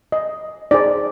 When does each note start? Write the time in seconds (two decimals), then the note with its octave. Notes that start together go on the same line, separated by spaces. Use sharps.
0.12 D#5
0.71 D#4 G#4 C5 D5